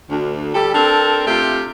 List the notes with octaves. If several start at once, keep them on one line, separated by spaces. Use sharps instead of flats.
D2
G3 G4 A4
C4 D4 A4 A#4
C3 A3 F4 G4